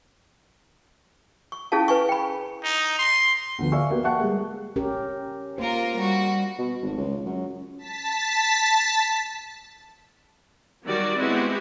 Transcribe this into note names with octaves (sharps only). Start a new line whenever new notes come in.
C#6
C#4 E4 G#4 A4 F5 A5
B4 G#5 C#6
G5 B5
D#4
C6
D2 D3 F3 B3
D5 E5 F5 G#5 C#6 E6
A#3 B3 F#4 G4
E5 F#5 G5 A5 C#6 F#6
G3 G#3 A#3
C#4 G4 A#4
A#3 F4 A#4 C5
G3 F#4
B2
G#1
C#2
F#2
A5 B6
D#3 F#3 G3 F#4 A#4 D5
G#3 B3 C4 E4 F#4 G4